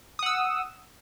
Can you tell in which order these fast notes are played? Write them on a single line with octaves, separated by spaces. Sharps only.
D#6 F#5 E6